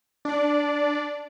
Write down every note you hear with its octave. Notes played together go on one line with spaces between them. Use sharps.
D4 D5